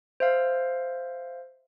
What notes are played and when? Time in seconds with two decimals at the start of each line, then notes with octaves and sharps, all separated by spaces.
0.20 C5 E5 F5